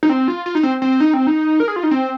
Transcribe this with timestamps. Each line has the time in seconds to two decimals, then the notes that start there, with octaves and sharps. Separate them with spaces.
0.03 D#4
0.09 C4
0.28 F4
0.46 F4
0.55 D#4
0.63 C4
0.82 C4
1.00 D#4
1.14 C4
1.27 D#4
1.60 A#4
1.68 G#4
1.76 F4
1.83 D#4
1.91 C4